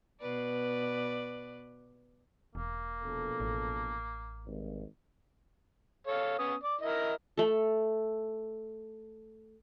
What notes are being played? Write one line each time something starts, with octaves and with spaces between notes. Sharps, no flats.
B2 B4 D5
E1 A#3
A#1 B2 A4
A1
G#1 G2
A4 C#5 F5
B3 C#4 D#6
D5 D6
E4 A#4 D#5
A3 A4